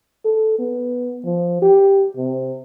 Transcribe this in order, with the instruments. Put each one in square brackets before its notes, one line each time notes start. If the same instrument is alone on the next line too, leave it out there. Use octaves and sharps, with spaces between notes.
[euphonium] A4
B3
F3
G4
C3